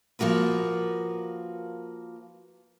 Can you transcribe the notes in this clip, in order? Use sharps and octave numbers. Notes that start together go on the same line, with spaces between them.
F3 A#3 F#4 A#4 B4